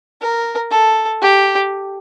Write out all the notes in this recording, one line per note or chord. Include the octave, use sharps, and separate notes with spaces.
A#4
A4
G4